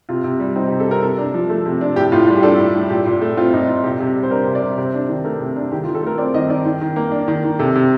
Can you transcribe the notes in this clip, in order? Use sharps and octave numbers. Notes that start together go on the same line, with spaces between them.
C3 F4
C3
G3
C4 D#4
G4
C3
A4
C3 A#4
C3 A4
D4
F3
A3
C3
D4
A2 G4
A2 F4
G3 F4
G4
D4 A4
A2
A2
A#2 G4
A#2
A3
C4 F4
A#2 D#4
A#2 F4
C3 G4
C3
G3
C5
D4 A#4
C3
D5
C3
C3 C5
D4
D#3
A3 A#4
C3
D4
D#3 G4
F4
D#3
A4
A3 A#4
C4 D5
D#3 D#5
D#3 D5
D#3
D#3
A#3
D4
D#3
D#3
C3 A4
C3